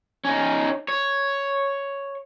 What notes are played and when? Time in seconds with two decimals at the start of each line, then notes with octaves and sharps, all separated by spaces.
0.25 C#4 D#4
0.88 C#5